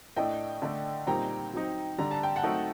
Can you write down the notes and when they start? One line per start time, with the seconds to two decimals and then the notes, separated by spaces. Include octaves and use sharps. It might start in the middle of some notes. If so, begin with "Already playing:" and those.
0.17 A2 A3 D4 D#5 G5
0.62 D3 A3 D4
1.07 A#2 G3 C4 D#4 G5 A#5
1.53 F#3 C4 D#4
1.98 D3 G3 D4 A#5
2.11 A5
2.23 G5
2.36 F#5 A5
2.43 F#3 A3 C4 D#4